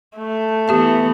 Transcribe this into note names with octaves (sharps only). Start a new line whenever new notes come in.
A3
E3 B3 G4 E5 A5